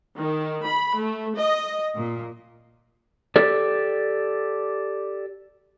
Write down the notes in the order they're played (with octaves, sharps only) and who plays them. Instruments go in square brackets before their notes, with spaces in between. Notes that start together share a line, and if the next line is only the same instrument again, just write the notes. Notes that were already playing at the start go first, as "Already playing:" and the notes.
[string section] D#3
B5
A3
D#5
A#2
[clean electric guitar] G4 A4 D5